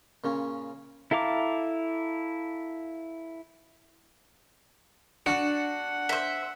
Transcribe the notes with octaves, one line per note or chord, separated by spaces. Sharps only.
A#2 C#3 C#4
E4 A4 F5 A#5 D6
D4 F#4 F#5
C5 E5